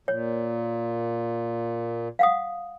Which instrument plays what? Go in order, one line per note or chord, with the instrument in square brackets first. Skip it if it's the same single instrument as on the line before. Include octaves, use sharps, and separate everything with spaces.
[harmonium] A#2 [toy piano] C#5
[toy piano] F5 F#5 D#6